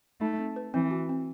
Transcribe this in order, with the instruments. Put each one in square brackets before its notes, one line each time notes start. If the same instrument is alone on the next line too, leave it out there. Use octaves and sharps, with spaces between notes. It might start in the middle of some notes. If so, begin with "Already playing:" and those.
[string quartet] A3 [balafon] D#4
[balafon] C4
B4
[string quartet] E3 [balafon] C4
[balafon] F#4
C4